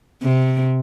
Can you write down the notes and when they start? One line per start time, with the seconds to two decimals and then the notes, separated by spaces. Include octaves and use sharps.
0.22 C3